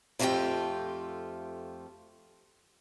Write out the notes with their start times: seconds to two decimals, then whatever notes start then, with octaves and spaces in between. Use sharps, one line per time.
0.19 F2 F3 A3 F4 G4 G5